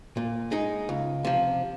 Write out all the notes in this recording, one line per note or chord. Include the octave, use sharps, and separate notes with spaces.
A#2
G#3 D#4
C#2
C3 F3